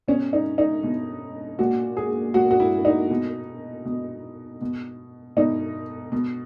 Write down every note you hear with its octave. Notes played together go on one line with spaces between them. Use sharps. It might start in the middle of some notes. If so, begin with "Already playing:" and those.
B2 C#4
D#4
D#4
B2
A#2 F#4
G#4
A#2 F#4
F#4
E4
D#4
B2
B2
B2
B2 D#4
B2